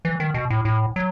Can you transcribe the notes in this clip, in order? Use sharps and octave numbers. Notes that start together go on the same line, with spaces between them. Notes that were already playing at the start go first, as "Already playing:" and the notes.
E3
D#3
B2
A2
A2
F#3